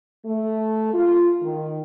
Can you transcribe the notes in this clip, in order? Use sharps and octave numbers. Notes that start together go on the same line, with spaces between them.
A3
F4
D#3